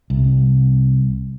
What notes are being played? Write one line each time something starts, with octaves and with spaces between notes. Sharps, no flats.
C2